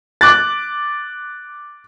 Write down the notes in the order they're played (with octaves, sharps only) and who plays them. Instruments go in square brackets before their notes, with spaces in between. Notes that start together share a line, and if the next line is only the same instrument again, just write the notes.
[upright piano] D6 F#6 A6